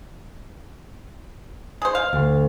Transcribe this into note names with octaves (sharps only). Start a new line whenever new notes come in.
G#4 C5
F5
D2